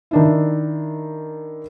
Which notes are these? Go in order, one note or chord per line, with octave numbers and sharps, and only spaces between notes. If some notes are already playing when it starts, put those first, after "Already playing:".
D#3 D4 E4